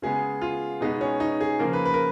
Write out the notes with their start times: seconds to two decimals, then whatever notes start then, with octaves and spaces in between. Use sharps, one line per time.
0.02 C#3 G#3 B3 G#4
0.41 F4
0.81 B2 G#3 B3 D#4
1.01 C#4
1.20 D#4
1.41 G#4
1.59 C#3 F3 A#3 A#4
1.73 B4
1.85 B4
1.94 A#4